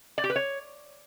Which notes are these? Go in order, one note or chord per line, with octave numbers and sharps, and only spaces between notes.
D5
G4
B4
C#5